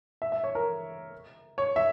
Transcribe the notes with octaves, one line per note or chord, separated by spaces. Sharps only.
E5
E5
C#5
A#4
C#5
E5